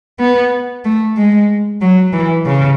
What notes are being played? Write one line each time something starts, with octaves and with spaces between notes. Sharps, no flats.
B3
A3
G#3
F#3
E3
C#3